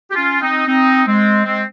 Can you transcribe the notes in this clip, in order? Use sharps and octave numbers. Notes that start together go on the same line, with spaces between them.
G4
C#4 F4
C4 D#4
C4 D#4
G#3 C4
G#3 C4